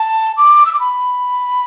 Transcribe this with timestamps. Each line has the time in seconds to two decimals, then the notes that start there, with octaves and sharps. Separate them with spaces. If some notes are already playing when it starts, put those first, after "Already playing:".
Already playing: A5
0.37 D6
0.66 E6
0.73 D6
0.80 B5